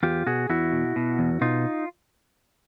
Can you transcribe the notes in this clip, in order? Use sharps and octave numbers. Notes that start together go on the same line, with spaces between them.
E2 F4 G4
B2 F#4 G#4
E2 E4 F#4
B2
B2
E2
B2 D#4 F4